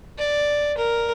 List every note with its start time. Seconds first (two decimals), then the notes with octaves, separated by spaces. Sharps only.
0.18 D5
0.77 A#4